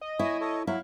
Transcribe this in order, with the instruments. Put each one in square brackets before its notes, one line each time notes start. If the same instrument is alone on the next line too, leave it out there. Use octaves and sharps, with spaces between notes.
[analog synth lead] D#5
[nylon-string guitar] E4 [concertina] C#5 G#5
[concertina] A4 C#5
[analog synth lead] F#3 [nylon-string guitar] E4 [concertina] F5